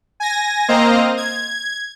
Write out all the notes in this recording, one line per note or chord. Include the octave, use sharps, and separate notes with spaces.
G#5 A#6
A#3 C4 C5 D#5 F5 A#5
G#6